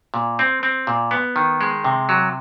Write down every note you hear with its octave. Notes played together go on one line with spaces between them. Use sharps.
A#2
C4
C4
A#2
B3
D#3
G#3
C3
F#3